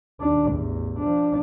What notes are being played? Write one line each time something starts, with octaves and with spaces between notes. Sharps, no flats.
D#2 D4
A1 E2
F3 D4